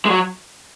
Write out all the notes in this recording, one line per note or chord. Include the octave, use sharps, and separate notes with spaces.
G#3
F#3